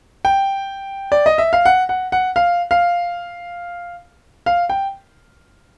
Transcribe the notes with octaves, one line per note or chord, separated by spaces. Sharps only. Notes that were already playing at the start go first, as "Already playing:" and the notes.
G5
D5
D#5
E5
F5
F#5
F#5
F#5
F5
F5
F5
G5